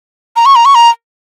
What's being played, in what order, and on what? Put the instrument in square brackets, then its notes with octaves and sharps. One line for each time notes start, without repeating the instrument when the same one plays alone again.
[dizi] A#5
C#6
A#5
C#6
A#5